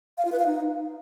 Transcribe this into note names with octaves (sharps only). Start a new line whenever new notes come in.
F5
F4
B4
F5
D#4